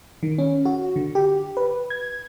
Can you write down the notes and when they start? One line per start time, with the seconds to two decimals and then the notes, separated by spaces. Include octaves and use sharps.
0.23 D#3
0.38 C#4
0.65 F#4
0.96 D3
1.15 G4
1.57 B4
1.90 G#6